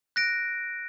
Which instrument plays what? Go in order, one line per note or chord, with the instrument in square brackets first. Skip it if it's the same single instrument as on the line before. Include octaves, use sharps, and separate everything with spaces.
[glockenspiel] F#6 A#6 D7